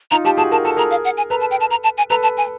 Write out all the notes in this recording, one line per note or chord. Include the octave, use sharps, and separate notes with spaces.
D#4 F4 A#5
F4 G4 A5
F#4 G#4 A5
A#4 A5
A4 A5
G#4 A#4 A#5
F5
F#5
G#5
A4 B4 A#5
A5
G5
A5
A#5
A5
G#5
A4 B4 A#5
A5
G#5